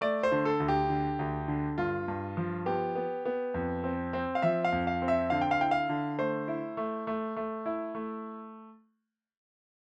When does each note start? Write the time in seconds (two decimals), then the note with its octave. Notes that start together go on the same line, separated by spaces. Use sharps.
0.01 A3 D5
0.23 C5
0.32 D3
0.45 A4
0.60 D2
0.68 G4
0.89 D3
1.19 D2
1.48 D3
1.78 G2 F4
2.08 G2
2.37 F3
2.66 B3 G4
2.95 B3
3.25 B3
3.54 F2
3.84 C4
4.13 C4
4.35 F5
4.42 F3 E5
4.64 F5
4.72 F2
4.87 F5
5.02 C4
5.08 E5
5.30 D3 F5
5.41 G5
5.51 F5
5.60 E4 G5
5.71 F5
5.89 D3
6.18 A3 C5
6.48 E4
6.77 A3
7.07 A3
7.36 A3
7.66 E4
7.95 A3